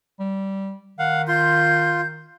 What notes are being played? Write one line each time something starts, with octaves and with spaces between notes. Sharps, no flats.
G3
D#3 F5 F#5
F4 C6 G6